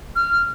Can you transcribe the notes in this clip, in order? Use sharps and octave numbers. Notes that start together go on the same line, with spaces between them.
F6